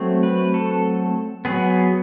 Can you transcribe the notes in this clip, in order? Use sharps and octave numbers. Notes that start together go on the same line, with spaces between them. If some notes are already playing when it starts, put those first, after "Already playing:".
Already playing: F#3 A3 C4
B4
A4
F#3 B3 G#4